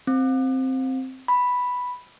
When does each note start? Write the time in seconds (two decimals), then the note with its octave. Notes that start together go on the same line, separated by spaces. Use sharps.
0.07 C4
1.28 B5